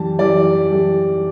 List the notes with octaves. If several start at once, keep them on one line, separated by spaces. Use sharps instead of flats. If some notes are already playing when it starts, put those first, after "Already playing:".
Already playing: F#2 E3 G3 A5
F#2 E3 G3 D5
F#2 E3 G3